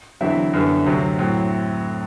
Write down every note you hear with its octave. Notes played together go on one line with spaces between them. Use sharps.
E2 D3 F#3 C4 E4 E5
F#2 D3 G3 B3
D2 C3 F#3 C4
A2 F#3 C4